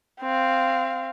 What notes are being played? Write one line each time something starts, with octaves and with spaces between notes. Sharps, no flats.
C4 F5